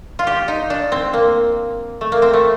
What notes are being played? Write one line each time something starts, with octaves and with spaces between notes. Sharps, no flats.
F4
G4
D#4
D4
C4
A#3
A3
A#3
C4
A3